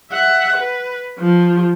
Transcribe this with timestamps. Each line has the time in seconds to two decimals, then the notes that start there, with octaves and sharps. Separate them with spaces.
0.12 E5 F#5
0.56 B4
1.19 F3